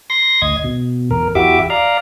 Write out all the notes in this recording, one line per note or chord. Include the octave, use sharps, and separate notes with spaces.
C6 A#6
D2 D#5 G#6
B2
E2 A#4
E2 E4 F#4 G4 E5 D6
D5 F5 A#5